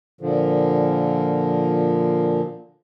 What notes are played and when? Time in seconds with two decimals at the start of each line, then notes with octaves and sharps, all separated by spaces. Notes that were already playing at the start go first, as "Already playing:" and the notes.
0.21 A#2 D3 F3